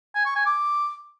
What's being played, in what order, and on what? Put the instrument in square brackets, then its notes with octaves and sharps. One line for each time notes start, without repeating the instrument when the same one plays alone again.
[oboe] G#5
C#6
G#5
D6